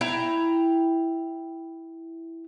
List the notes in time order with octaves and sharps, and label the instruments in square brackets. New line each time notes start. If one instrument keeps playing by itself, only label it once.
[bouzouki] E4 G5 A#5